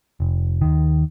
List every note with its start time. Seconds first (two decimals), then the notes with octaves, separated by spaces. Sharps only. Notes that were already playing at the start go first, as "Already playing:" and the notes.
0.20 F1
0.61 D#2 D#3